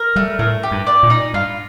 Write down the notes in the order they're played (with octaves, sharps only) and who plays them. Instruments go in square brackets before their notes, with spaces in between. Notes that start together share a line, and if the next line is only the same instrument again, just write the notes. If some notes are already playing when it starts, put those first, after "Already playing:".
Already playing: [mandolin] A#4
[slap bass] G3 [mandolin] A3
[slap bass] A2 [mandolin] A#4
[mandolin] G4
[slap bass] G2
[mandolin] D5
[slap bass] A#2
[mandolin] D#4
[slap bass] G2 [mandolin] F4